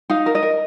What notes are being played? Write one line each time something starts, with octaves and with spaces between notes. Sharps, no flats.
D#4 F5
A#4
D#5
A#4